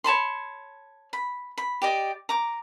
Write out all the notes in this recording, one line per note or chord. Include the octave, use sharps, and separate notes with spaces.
C#5 A5 B5 C6
B5
B5
G4 D5 D#5
A#5 D6